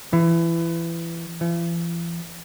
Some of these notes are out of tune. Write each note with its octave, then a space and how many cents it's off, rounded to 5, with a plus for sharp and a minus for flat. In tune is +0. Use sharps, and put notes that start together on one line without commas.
E3 +25
E3 +45